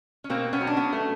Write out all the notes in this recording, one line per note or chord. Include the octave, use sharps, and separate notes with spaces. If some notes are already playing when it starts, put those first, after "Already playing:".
C#4
B2 A#3 C4
B3 C#4
F#3
D4
B3 C#4
A3